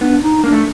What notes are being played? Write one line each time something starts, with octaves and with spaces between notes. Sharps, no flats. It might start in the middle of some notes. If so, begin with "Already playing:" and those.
B3 D4 D#4
D#4
A#3 D4
A3